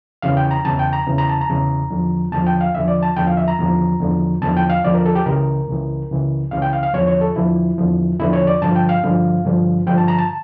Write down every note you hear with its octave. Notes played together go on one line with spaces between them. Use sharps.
E2 C#3 E3 F5
G5
A#5
E2 C#3 E3 A5
G5
A#5
E2 C#3 E3
A#5
A5
A#5
E2 C#3 E3
E2 D3 F3
E2 D3 F3 A5
G5
F5
E2 D3 F3 E5
D5
A5
E2 D3 F3 G5
F5
E5
A#5
E2 D3 F3
E2 D3 F3
E2 D3 F3 A5
G5
F5
E2 D3 F3 D5
A#4
A4
G4
C#2 C#3 E3 A#4
C#2 C#3 E3
C#2 C#3 E3
C#2 C#3 E3 F5
G5
F5
F5
E2 D3 F3 C#5
C#5
A4
E2 D3 F3 E4
E2 D3 F3
E2 D3 F3 E4
C#5
D5
G2 D3 F3 A5
G5
F5
G2 D3 F3
G2 D3 F3
G2 D3 F3 G5
A5
A#5
A5